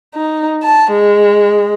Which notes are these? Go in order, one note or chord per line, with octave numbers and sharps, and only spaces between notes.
D#4
A5
G#3